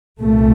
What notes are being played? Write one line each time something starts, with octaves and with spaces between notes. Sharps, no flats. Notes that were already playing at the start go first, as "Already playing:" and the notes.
C2 A#2 A3